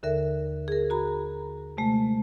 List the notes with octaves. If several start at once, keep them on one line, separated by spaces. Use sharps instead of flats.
D#2 D3 A4 A#4 E5
G#4 A#4
F#4 A#5 B5
C3 G#3 A3